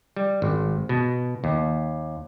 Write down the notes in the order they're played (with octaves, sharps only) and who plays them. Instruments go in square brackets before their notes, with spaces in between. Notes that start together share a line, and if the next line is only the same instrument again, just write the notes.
[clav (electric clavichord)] G3
G#1
B2
D#2